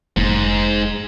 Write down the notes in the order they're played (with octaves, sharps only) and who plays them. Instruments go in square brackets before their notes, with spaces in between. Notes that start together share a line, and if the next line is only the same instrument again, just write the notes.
[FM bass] F1 [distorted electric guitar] G#2